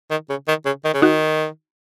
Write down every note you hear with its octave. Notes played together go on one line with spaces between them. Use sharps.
D#3
C#3
D#3
C#3
D#3
C#3
D#3 D#4 F#4